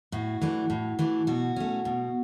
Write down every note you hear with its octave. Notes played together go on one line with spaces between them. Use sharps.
A2 F#4
E3 A3 D4
A2
E3 A3 D4
B2 F#4
A3 C#4
B2